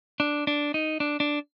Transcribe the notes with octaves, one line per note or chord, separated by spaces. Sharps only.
D4
D4
D#4
D4
D4